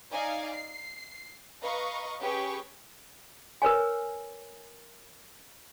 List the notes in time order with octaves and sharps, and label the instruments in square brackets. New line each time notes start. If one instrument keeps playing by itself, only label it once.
[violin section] D#4 D5 D#5 F5 G#5
C7
B4 D#5 F5 A#5 C#6
C#4 G4 G#4 B4 G5 C#6
[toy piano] A#4 B4 C#5 G#5